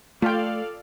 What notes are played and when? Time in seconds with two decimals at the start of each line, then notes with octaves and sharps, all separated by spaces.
0.22 A3 F4 A4 D5 F5 G5